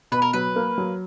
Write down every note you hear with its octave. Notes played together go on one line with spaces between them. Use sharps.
B2 B4
A#4
F#3 B4
A#3
F#3